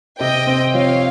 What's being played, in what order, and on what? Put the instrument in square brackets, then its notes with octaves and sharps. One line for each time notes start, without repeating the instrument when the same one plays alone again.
[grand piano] C3 [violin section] D#5 G5
[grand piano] C4
[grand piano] F3 [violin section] C#5 F5